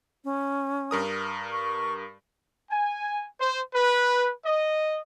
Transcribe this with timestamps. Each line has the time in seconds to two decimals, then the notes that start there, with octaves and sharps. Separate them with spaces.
0.24 C#4
0.91 G2 A#4 D#6
1.52 C#6
2.69 G#5
3.39 C5
3.74 B4
4.45 D#5